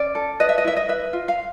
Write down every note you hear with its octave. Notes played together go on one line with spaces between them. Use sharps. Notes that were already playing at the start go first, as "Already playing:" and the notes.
Already playing: C#4 D5
A4
B4 D#5
E5
D#5
E4 E5
D#5
B4 E5
F4
F5